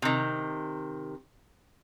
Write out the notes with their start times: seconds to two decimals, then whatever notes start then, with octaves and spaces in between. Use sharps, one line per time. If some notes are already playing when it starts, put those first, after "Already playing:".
0.02 C3 D#3